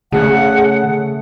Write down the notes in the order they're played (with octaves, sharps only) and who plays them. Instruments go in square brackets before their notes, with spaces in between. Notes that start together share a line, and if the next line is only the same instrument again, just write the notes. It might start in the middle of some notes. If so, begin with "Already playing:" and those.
[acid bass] C#3 [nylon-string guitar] A3 D5 [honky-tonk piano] G#4 [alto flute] F#5